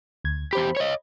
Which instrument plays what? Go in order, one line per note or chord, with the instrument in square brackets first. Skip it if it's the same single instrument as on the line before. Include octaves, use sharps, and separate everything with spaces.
[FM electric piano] D2 G#6
[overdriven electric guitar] E2 G4 [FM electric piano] C5 B5
[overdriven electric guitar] C#5 D#5